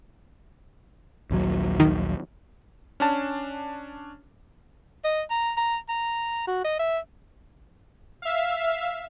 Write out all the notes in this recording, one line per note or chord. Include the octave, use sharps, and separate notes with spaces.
A#1 D#2 F#3
D#3
C#4 D4 A5
D#5
A#5
A#5
A#5
F#4
D#5
E5
E5 F5